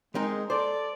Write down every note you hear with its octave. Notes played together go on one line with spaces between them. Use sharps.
G#3 C4 D#4 A#4
A4 C5 D5